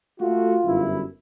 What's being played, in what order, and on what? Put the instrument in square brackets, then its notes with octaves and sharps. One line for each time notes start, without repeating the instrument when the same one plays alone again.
[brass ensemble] A3 F#4 [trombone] F4
[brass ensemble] G1 F#2 E4